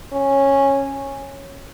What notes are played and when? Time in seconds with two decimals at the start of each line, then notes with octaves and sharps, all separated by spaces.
0.13 C#4